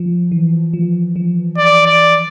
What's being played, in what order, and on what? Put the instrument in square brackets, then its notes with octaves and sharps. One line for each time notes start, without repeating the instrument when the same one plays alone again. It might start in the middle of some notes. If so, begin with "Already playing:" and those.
Already playing: [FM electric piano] F3
E3
F3
F3
[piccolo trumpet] D5
D5